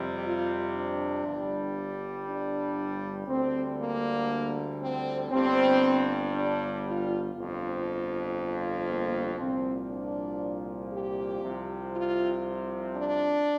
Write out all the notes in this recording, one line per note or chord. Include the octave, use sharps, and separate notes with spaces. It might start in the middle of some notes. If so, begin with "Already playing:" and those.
Already playing: F2 C3 G3
F4
D4
G1 G2 G3
D4
D2 D3 G3 C4
A#3
C4
G1 G2 G3 C4
D4
F4
G1 F2 F3
A#3
C2 A#2 F3 C4
D4
G4
C2 C3 F3
F4
D4